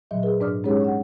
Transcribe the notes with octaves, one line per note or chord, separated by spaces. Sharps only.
A#2 D3 F#3 D#5 E5
G#4 A#4 B4
G#2 D4 D5 D6 D#6 F6
G#3 C#4 D#4 G4 G#4 C#5
F#5 C#6